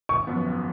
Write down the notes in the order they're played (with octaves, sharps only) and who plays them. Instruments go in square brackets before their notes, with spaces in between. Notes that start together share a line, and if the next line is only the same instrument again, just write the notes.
[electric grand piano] G#1 [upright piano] C#6
[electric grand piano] F#2 F3 B3
G#1